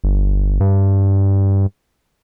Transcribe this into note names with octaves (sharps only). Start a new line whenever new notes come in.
G1
G2